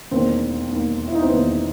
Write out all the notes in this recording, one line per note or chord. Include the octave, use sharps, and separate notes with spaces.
E1 D#2 D#3 C4
E1 D#2 D#3
E4
D#4
C4
E1 D#2 D#3 B3